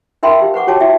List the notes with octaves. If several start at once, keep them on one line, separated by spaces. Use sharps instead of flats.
D#4 A#4 E5 G5 B5 C6
G4 F5
B4 F#5 C#6 D6
F#4 G4 C#5 G5 A5 D6
E4 F#4 E5 G5